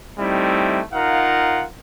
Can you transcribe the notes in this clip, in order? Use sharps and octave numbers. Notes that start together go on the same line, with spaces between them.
G3 A3 C4 D#4 E4
D#4 F4 A#4 F5 F#5